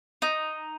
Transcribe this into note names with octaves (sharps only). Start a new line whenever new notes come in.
D#4